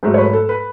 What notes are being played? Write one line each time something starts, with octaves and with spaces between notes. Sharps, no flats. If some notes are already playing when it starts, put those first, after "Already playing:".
G#2 F#3 A3 A4
C#5
B4
A4
B4